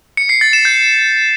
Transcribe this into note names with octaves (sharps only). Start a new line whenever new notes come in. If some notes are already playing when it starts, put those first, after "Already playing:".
C#7
C7
A6
E7
G6